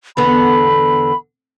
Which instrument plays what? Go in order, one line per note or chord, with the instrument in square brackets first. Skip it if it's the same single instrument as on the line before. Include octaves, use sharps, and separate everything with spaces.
[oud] E2 D3 B3 [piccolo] B5